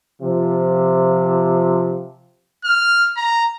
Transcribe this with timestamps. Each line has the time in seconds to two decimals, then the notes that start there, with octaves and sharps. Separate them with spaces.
0.21 C3 F3
2.64 F6
3.16 A#5